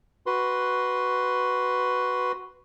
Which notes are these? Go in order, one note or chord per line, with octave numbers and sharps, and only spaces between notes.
F#4 B4 C6